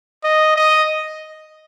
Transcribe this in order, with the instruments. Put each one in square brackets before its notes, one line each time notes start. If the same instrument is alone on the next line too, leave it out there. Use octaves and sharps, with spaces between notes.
[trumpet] D#5
D#5